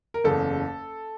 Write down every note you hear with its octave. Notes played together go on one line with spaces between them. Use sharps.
A#4
F#1 E2 C#3 A4